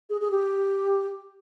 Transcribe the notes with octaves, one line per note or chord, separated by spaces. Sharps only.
G#4
G#4
G4